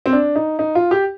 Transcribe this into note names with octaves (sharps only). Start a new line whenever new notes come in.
C4
D4
D#4
D#4
F4
G4